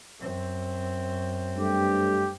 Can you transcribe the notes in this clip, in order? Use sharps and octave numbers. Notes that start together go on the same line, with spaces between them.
F#2 C4
G2 A3 G4